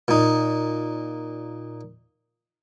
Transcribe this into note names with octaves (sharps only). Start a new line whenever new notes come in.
A#2 D#4